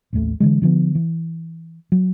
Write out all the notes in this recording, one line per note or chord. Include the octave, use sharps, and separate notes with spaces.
A1 D#2 G3 A3
D3 E3 G#3
D3 F3 G3 B3
E3
F#3